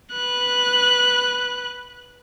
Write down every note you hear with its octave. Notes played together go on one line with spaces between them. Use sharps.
B4 F#6